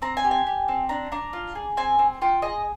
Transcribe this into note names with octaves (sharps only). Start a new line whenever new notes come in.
C4 A#5
G#5
G4
G#5
G4
C4
D4 A#5
D4 A#5
F4
G#4
C4 G#5
C4
F4 G5
G#4 D#5